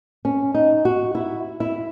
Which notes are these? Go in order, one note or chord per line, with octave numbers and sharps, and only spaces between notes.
C#4
D#4
F#4
E4
E4